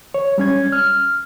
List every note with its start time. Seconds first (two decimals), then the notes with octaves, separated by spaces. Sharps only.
0.14 C#5
0.38 G3 C#4 G#6
0.72 F6